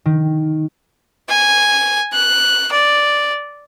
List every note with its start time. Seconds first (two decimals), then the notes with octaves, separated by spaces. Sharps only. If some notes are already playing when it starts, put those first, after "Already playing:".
0.05 D#3
1.29 G#5
2.13 F#6
2.72 D5